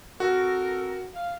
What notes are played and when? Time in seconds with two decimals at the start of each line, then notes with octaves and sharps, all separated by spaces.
0.20 C4 F#4 A4 A#4
1.14 F5